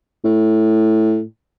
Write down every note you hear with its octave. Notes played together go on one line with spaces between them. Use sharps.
A2